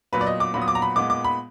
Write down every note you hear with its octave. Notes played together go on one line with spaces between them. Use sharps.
A#2 F#3 B3 B4
D5
D#5
D6
A#2 F#3 B3 B5
D#6
D6
A#5
B5
A#2 G#3 B3 D6
D6
B5